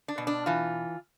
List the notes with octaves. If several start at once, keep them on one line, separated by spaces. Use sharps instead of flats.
D4
B2
D4
E3 F4